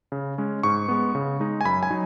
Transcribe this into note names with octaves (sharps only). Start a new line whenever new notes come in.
C#3
G#3 C#4
G#2 C#6
G#3 B3
C#3
G#3 D#4
G#5
F#2 B5
G#5
F#3 D#4